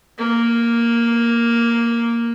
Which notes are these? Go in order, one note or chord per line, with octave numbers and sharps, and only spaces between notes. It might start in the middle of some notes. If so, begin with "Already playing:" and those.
A#3